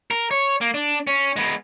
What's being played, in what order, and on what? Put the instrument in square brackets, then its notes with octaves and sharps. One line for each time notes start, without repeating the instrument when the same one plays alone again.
[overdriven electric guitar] A#4
C#5
A#3
D4
C#4
G#3 B3